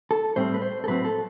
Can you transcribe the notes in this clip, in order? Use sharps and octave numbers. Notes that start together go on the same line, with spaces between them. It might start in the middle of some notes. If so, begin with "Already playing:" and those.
A4
A2 G3 C4 C5
B4
C5
A4
A2 F#3 C4 B4
A4